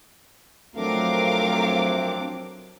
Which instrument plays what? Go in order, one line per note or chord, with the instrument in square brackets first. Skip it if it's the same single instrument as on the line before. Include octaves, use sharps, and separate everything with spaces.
[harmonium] F3 C4 D4 [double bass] F#3 [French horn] A3 [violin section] A#4 F5 D6